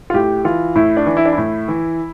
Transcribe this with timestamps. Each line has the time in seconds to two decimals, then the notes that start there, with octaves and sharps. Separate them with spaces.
0.10 F4
0.14 A2 G4
0.44 E3 F4
0.76 A2 E4
0.97 D4
1.07 E3
1.17 E4
1.25 D4
1.33 A2 E4
1.68 E3